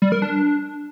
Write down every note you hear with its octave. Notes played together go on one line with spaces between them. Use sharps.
G3
A#4
D4